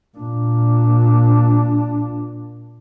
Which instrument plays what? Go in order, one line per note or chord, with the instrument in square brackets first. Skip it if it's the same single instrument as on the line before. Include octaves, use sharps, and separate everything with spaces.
[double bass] A#2 D4